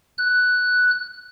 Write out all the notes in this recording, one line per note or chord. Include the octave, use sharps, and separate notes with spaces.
F#6